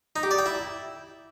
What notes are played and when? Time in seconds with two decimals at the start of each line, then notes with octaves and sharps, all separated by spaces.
0.16 D#4
0.23 G4
0.31 D5
0.38 G5
0.46 E4